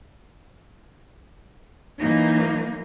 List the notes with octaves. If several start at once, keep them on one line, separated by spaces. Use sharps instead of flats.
E3 F#3 A#3 D#4